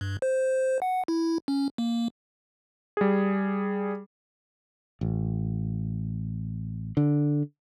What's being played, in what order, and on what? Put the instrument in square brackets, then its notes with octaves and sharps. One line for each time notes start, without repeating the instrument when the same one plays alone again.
[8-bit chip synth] G2
C5
F#5
E4
C#4
A#3
[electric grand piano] G3 G#4
[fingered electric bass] A1
D3